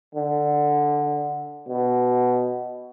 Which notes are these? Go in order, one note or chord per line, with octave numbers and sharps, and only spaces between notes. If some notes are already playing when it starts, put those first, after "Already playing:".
D3
B2